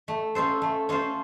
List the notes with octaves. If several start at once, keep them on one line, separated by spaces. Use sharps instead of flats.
A3
C#4 F4 A4 C5
A3
C#4 F4 A4 C5